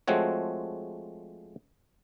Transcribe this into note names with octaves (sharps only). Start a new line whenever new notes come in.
F3 G#3 A3 C4 F#4 C#5